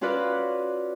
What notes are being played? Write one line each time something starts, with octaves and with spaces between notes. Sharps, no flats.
C#4 F4 F#4 B4 D5